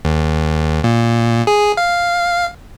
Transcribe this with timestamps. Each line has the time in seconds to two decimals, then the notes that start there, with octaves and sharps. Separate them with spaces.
0.05 D#2
0.84 A#2
1.47 G#4
1.77 F5